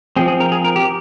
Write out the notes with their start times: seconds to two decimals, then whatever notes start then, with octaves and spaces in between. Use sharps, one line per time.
0.16 F3 C4 G#4
0.28 G#4
0.40 A#4
0.52 G#4
0.64 A#4
0.76 G4